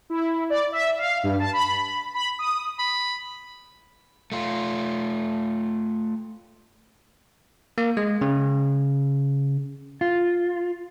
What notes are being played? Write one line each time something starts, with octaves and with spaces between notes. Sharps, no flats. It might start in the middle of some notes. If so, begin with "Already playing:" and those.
E4
D5
E5
F5
G2
A5
B5
B5
D#6
B5
A3 F4
A#3
G#3
C#3
F4